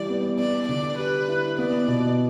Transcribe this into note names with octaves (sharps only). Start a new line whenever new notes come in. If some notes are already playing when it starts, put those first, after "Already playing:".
Already playing: E3 G3 E4 D5
B3
B3 D5
D3 D5
G4 B4
E4
B3 D5
B2